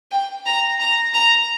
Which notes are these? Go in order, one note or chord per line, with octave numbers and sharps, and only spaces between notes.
G5
A#5
A#5
A#5